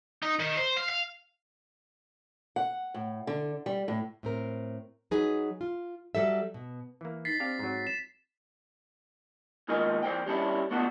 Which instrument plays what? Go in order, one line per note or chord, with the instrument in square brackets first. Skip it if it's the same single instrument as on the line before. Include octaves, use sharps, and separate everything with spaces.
[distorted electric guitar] D#4
D#3
C5
F5
F5
[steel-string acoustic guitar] F#5
A2
D3
G3
A2
[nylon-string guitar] A2 C4 A#4
F#3 D#4 G#4 B4
F4
F#3 G3 A4 E5
B2
[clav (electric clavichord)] E3 A#3
[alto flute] D#4 [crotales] A6 B6 C7
[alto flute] C4 [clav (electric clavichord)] D4 G4 F5
[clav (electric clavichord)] G#2 F#3
[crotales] E7
[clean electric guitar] D#2 G#3 F4 A#4 D#5 G#5
F2 C5 D5 G5
G3 C#4 D4 E4
A3 B3 D4 F4 F#4